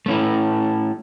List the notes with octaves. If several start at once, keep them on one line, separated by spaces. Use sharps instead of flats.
A3 C#4 E4